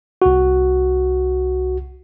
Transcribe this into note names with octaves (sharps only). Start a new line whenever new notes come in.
C2 F#4